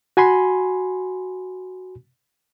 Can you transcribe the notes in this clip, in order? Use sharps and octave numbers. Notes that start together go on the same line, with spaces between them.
F#4 G#5 B5 C6